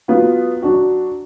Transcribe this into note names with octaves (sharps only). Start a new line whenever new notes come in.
F#3 B3 F4
F#3 D4 F#4